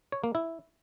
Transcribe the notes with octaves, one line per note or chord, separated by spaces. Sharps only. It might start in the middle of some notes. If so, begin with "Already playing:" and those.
C#5
A#3
E4